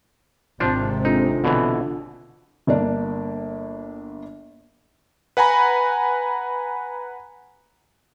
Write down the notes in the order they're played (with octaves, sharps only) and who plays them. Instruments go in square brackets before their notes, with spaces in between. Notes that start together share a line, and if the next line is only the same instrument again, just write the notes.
[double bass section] G#1 C3 [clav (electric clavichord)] F3 D4 F4
[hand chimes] D4 F4 A4 [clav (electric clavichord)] D#4
[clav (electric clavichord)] B2 D3 E3
[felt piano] G1 A#3 D4
[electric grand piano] B4 F#5 G#5 A#5 B5